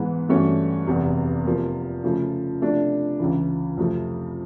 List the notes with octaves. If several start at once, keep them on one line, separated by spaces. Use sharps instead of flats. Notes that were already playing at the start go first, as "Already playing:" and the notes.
Already playing: G#2 E3 G#3 B3
G2 E3 A3 C#4 F#4
F1 E2 C3
C3 F3 A#3
C#3 F3 A3
C3 F3 A3 D4
C#2 C#3 E3
F2 C3 F3 A3